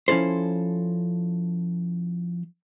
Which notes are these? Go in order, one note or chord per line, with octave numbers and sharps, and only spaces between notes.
F3 C#4 E4 A4 C5